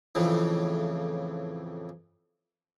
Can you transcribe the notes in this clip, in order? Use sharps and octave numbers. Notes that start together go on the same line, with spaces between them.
F2 A2 C#3 E3